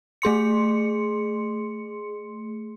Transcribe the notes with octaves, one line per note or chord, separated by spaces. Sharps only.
A3 G#4 C6 C#7